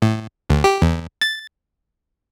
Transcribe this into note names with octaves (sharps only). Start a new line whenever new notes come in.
A2
D2
G4
E2
A6